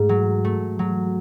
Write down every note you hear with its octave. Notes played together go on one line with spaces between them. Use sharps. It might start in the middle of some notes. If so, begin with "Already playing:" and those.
Already playing: G#2 A3
F#3
A3
F#3